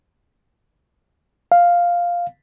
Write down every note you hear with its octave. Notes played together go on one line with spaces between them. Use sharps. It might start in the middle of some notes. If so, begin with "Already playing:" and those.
F5